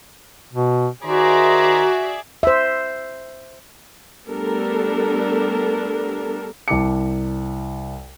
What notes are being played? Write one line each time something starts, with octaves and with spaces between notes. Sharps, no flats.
B2
D#3 F#4 G#4 C5 D5 E5 A#5
C5 E5
G3 A3 B3 D4 A4 A#4
C2 A5 D6 C#7